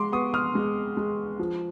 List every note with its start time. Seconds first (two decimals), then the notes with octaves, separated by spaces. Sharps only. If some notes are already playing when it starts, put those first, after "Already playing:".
Already playing: G#3 C6 D6
0.12 B3 C#6 D#6
0.34 D#6 F6
0.55 G#3
0.97 G#3
1.39 F3